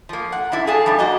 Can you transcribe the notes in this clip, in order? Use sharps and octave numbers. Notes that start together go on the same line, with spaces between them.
F3 A#3
F#5
F#2 D4 E4
G#4 A4 F5 G#5 A5
F3 G3 D4
A#3 F#4 D#5